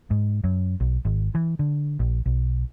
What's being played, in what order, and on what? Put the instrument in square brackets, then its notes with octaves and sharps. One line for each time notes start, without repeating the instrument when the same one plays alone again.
[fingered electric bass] G#2
F#2
B1
G#1
E3
D3
A#1
B1